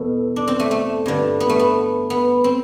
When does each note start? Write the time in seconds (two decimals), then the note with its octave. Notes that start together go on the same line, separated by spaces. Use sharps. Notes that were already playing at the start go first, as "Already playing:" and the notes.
Already playing: E2 B2 A4
0.36 D4
0.48 C4
0.60 A3
0.71 A3
1.06 G2 D3
1.40 B3
1.49 A3
1.59 B3
2.10 B3
2.44 C4